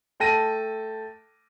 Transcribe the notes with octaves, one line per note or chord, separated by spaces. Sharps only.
A3 A4 G5 A5 A#6 D#7